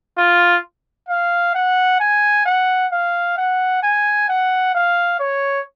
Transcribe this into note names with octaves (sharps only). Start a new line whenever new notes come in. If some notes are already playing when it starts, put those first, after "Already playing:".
F4
F5
F#5
G#5
F#5
F5
F#5
G#5
F#5
F5
C#5